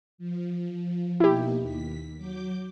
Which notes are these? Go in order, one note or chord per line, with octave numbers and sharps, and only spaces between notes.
F3
B2 A#3 D#4 E4 G4
D#2 B6
F#3 D6 G6